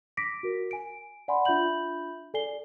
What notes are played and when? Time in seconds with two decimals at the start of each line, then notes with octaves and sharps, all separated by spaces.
0.17 D6 A#6 B6 D7
0.43 F#4 A#4
0.71 G#5 D7
1.28 D5 F#5 G#5 B5 C6
1.45 D4 F4 E5 B5 G6 F#7
2.34 A4 D5 G#5 C7 G7